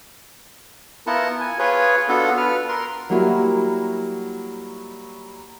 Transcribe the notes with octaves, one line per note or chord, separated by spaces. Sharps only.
B3 E4 F4 A#4 F#5 A5
G#5
F4 G#4 B4 C#5
B3 D4 F4 F#4 A4
B4 F6
A#4 C6
F#3 G3 A#3 E4 F#4